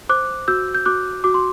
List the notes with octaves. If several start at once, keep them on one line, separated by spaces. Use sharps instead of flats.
C5 D6 F#6
F#4 E6 G6
G6
F#4 D6 F#6
F#4 D6
C6